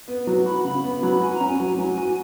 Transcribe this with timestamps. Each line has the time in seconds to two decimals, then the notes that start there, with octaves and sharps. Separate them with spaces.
0.08 B3 B4
0.27 F#3
0.45 F#4 B5
0.64 C#3 B5
0.84 B3
1.03 F#3
1.22 F#4 G#5
1.34 A#5
1.40 C#4
1.48 G#5
1.60 F#3
1.78 F#3
1.97 F#4